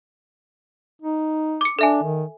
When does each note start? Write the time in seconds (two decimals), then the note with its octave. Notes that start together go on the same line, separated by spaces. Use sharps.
1.02 D#4
1.61 D6 C#7
1.79 D4 A4 E5 G#5
2.03 D#3